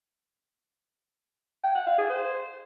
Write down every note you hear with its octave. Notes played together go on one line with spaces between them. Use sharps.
G5
F#5
F5
G#4
C5